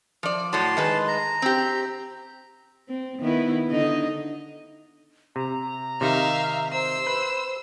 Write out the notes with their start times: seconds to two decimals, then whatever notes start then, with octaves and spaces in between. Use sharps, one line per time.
0.23 F3 D5
0.53 A2 F#3 A5 C6
0.77 D#3 G#3 B4
1.08 A#5
1.42 C4 G4
2.88 C4
3.20 D#3 B3 E4
3.69 D3 D#4 D#5
5.36 C3 A#5
6.01 C3 D#3 D#4 E5 F5
6.71 C5 E6 C7
7.07 B4